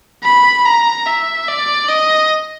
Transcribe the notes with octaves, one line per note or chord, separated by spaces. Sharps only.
B5
A#5
E5
D5
D#5